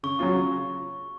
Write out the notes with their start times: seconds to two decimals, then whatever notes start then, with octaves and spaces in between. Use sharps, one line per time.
0.03 C#3 C#6
0.19 F#3 C#4 F4
0.34 C#3